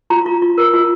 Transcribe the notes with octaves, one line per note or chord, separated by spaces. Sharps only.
F4 A#5
F4
F4
A#4
F4